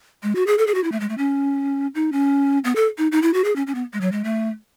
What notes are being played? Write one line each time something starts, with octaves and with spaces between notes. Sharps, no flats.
G#3
F#4
G#4
A4
G#4
F#4
E4
A3
G#3
A3
C#4
D#4
C#4
B3
A4
D#4
D#4
E4
F#4
G#4
C#4
C#4
B3
G#3
F#3
G#3
A3